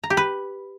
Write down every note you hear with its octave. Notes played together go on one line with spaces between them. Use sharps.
A#5
G4
B4